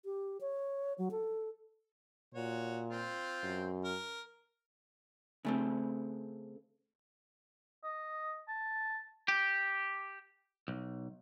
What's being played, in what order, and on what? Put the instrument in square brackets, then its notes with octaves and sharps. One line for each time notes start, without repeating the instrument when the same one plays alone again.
[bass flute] G4
C#5
F#3
A4
[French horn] A#2 [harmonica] F#4 C#5
[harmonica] C4 F4
[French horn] F#2
[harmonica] A#4
[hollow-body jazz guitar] C#3 A3 C4
[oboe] D#5
A5
[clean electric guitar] G4
B1